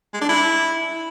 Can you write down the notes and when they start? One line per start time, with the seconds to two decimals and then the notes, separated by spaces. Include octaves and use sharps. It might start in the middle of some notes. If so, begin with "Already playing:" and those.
0.14 G#3
0.21 D4
0.29 E4